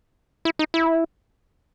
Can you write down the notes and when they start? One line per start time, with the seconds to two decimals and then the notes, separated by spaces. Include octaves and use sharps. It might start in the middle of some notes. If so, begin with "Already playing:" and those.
0.45 E4
0.59 D#4
0.74 E4